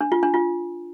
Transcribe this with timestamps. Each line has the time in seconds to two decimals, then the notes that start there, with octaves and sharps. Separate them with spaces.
0.01 D4
0.12 F4
0.23 D4
0.34 F4